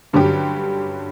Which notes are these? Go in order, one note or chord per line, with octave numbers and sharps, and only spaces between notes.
G2 D3 F#3 C#4 G4